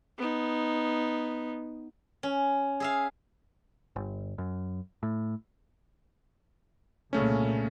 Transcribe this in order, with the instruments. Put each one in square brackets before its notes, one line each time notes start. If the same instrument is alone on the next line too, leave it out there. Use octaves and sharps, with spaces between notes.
[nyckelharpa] B3 D#4
[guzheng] C#4
G#4 E5 F5
[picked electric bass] G1
F#2
A2
[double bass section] C2 A#2 A#3 [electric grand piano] C#3 A3 C#4